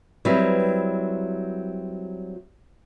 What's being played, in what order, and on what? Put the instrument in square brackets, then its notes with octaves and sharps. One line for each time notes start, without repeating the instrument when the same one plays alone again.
[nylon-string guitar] F#3 G3 C4 E4 B4